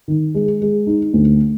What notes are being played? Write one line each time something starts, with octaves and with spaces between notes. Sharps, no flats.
D#3
G#3
G#3
D#4
D2